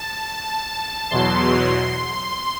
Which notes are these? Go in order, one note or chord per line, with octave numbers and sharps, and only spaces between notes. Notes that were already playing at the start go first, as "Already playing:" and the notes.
Already playing: A5
E2 B2 F#3 C6